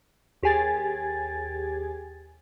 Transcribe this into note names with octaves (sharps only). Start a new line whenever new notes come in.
D#2 G4 G#4 G#5 G#6 A6